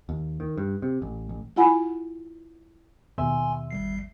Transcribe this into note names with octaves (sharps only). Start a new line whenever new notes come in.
D#2
D#3
G2
C3
A1
A1
E4 F4 F#5 G#5 B5
D#2 B2 E5 G#5 C6
G1 G3 C7